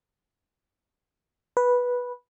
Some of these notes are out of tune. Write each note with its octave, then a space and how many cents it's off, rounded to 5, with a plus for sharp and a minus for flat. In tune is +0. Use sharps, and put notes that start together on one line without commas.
B4 -10